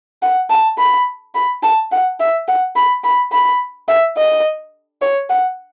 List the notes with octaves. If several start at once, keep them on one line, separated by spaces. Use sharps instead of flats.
F#5
A5
B5
B5
A5
F#5
E5
F#5
B5
B5
B5
E5
D#5
C#5
F#5